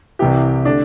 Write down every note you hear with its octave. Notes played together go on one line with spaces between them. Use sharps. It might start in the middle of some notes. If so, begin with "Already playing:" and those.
C2 C3 E3 G4
D3 A3 D4